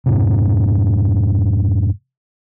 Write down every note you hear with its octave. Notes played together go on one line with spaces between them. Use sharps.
F2 G#2 C3